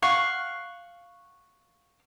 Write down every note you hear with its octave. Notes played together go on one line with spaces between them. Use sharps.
F5 F#5 C#6